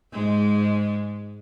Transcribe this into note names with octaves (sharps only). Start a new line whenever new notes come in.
G#2 G#3